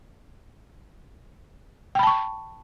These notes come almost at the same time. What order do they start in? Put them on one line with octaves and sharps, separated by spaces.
G5 B5 A5 C#6